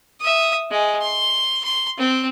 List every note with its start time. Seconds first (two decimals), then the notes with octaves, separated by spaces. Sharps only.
0.20 E5 D#6
0.71 G#3
1.01 C6
1.63 C6
1.98 C4